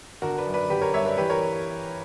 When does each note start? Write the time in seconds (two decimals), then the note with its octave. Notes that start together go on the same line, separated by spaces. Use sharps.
0.22 D3 F#4 A#4
0.38 B4 D5
0.46 F#2
0.54 B4 D5
0.70 D3 G4 B4
0.81 A#4 C#5
0.94 G2 C#5 E5
1.06 B4 D5
1.18 E3 G4 B4
1.30 A#4 C#5